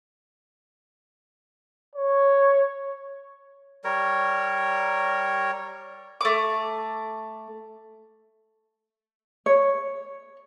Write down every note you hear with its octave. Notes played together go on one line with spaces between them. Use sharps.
C#5
G3 A#4 C#5
A3 D6
C#5